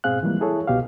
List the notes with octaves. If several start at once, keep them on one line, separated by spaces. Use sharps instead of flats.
G#2 B2 C4 G#4 F5 F#6
E3 F3 G3 G#3 A#3
E4 G#4 A4 C#5
C2 B2 G4 F5